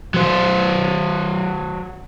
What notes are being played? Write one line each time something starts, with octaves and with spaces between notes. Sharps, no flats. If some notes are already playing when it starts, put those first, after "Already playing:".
F#3 C5